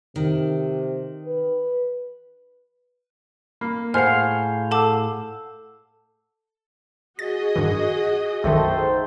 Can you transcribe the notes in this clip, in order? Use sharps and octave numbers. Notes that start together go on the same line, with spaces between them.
C3 D#3
B4
A#3 B5
A2 G#4 C5 F5 F#5 G#5 F6
A4 F#5 A5 D6 E6
F#4 G#4 D#5 A6
G2 D#3
B1 F#2 D#3 A3 A4 C5 G5
G#2